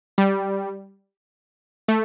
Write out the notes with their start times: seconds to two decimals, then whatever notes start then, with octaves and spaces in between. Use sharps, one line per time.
0.18 G3
1.88 A3